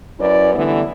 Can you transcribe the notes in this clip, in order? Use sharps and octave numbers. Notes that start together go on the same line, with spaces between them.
F#2 C#4 E4 B4 D5
D3 E3 G3 A3 B3